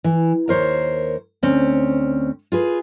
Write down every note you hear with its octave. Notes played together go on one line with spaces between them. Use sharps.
E3
D#2 A#4 C5 C#5
D2 C4 C#4
F4 G#4 B4